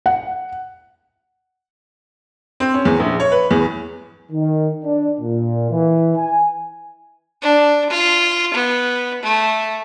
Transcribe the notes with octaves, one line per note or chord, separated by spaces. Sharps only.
F#5
C4
C#4
E2
A#1
C#5
B4
E2
D#3
D4
A#2
E3
G#5
D4
F4
B3
A3